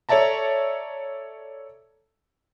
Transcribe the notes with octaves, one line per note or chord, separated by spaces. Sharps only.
A4 C#5 D5 E5 A5 A#5